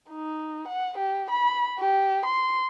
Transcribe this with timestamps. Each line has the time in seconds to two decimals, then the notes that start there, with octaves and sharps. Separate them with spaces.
0.10 D#4
0.68 F#5
0.98 G4
1.30 B5
1.79 G4
2.25 C6